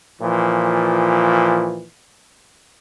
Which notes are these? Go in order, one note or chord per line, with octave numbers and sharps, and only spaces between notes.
A#2 E3 F3